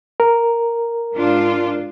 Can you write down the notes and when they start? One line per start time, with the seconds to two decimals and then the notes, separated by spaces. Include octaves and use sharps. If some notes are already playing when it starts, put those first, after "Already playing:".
0.20 A#4
1.13 G#2 D4 F4